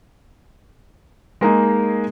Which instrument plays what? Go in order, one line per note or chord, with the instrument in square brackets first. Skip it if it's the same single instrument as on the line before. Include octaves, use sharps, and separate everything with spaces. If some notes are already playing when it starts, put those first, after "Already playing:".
[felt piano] G#3 A#3 D#4 G#4